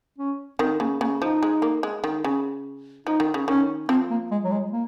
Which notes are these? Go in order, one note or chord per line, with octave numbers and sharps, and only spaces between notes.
C#4
D#3 C4
C#3 A#3
C#3 A#3
F3 D#4
G#3
A#3
G#3
D#3
C#3
F3 D#4
D#3
C#3
D#3 C#4
F3 C4
A#3
G#3
F#3
G#3
A#3